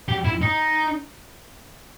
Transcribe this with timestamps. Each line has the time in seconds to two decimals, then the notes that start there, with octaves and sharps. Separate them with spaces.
0.09 G4
0.25 E4
0.42 D#4